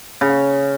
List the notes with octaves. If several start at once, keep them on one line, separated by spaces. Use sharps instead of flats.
C#3